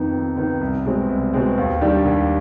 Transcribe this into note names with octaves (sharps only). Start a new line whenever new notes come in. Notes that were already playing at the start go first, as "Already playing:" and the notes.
Already playing: F2 D#3 B3 D#4
F2
D#3 B3 D#4
C2
B2 G#3 C4
C2
B2 G#3 C4
D#2
D#3 G3 D4 G4
D#2